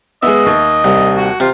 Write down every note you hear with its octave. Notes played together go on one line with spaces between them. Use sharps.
G#3 B3 D#5 E5
D#2
C2
F#4
C3 F4